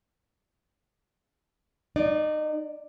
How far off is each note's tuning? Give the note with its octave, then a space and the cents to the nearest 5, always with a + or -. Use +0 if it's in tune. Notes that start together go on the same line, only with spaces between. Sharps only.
D#4 -25 D5 +0